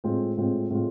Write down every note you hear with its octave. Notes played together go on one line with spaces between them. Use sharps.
A2 G#3 C4 F4
A2 G#3 C4 F4
A2 G#3 C4 F4